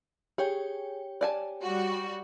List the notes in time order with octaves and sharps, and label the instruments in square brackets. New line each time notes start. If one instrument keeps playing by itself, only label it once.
[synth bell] G4 C#5 G5 [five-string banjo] G#4
[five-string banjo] D5 G#5 A5
[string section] G3 F#4